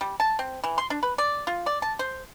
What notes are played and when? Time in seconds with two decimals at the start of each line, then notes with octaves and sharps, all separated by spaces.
0.01 G3
0.20 A5
0.39 C4
0.64 E3
0.78 C6
0.90 D4
1.03 B4
1.18 D5
1.47 F4
1.66 D5
1.82 A5
1.99 C5